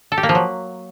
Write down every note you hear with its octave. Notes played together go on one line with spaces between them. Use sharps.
A4
G4
A#3
F3
F#3